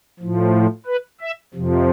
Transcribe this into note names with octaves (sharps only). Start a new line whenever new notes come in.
A2 F3
B4
E5
F2 C3 F3